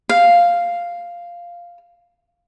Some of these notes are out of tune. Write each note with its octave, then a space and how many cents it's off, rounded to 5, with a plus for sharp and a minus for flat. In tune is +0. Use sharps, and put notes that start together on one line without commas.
F5 -5